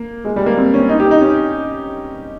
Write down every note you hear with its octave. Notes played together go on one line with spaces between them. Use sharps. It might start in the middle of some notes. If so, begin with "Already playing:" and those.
Already playing: A#3
G#3
G3
A#3
C4
C#4
D#4
G4
D#4
C#4